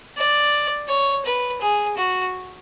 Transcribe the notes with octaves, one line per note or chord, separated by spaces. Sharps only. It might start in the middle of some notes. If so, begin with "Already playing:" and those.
D5
C#5
B4
G#4
F#4